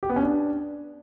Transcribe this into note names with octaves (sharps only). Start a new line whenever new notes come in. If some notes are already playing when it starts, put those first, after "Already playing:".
G4
B3
C#4
D4